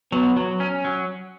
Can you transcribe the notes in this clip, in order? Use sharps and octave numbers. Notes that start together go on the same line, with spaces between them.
F#3 B3
F#3
C#4
F#3